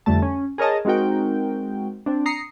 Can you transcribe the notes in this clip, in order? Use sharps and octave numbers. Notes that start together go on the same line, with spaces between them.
F2 D3 G3 A3 A5
C#4
G#4 A#4 C#5 D#5 A5
G#3 C4 D#4 F#4 A#4 G5
C4 D4
A#5 D#6 C7 C#7